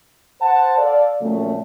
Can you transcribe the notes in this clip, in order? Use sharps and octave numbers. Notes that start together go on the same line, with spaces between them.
C5 F#5 A5
A4 D5 F5
F2 A#2 C#3 F#3 A3